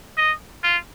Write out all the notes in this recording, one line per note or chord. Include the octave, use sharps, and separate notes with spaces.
D#5
F4